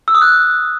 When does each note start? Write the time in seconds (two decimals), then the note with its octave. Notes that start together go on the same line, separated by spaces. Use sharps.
0.08 E6
0.15 D#6
0.22 F#6